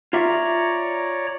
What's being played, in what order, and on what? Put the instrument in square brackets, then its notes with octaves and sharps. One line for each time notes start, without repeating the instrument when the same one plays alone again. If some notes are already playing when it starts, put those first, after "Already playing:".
[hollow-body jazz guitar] F4 E5 [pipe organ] C#5 D5 A#5